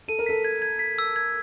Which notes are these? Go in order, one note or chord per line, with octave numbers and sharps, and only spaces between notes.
A4 D#7
A#4
A4 B6
G#6
G#6
B6
E6
G#6